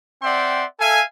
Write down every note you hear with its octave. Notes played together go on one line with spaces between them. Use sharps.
C4 D5 E5 F#5 G5 C6
A4 E5 F5 G#5